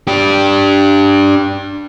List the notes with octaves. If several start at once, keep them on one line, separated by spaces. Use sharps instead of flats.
D4 G4